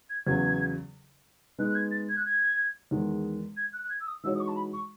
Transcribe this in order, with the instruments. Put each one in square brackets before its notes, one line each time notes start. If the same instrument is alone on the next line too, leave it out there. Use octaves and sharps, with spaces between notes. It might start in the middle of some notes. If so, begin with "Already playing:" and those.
[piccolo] G#6
[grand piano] E2 C#3 F#3 B3 [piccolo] G#6
[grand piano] G#3 B3 D#4 [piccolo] F#6
[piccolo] F#6
G#6
A6
G#6
F#6
G#6
[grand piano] E2 D#3 G#3
[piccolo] G#6
F#6
F#6
G#6
E6
D#6
[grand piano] E3 G#3 D#4 F#4 C#5 [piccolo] E6
[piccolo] D#6
C#6
A5
B5
C#6